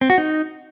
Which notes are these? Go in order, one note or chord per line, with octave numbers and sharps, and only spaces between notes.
C4
F#4
D#4